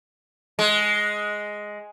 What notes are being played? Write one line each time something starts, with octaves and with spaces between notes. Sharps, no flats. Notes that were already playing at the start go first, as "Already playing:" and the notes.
G#3